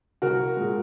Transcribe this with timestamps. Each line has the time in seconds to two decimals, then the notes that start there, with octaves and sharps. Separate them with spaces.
0.22 C2 F#4 A#4
0.57 A#2 G#3